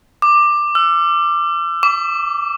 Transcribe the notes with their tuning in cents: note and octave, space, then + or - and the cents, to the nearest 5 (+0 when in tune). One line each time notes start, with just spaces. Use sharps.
D6 +15
E6 +40
D6 -25